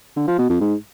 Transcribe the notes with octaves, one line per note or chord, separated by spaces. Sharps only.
D3
F3
B2
F2
G#2